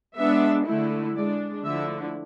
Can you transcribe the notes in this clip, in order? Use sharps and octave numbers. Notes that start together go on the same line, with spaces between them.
G#3 B3 D4 E5
D3 A3 E4
G#3 D4 D5
D3 F3 A3 E4 E5